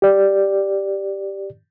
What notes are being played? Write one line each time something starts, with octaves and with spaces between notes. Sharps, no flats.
G4 D5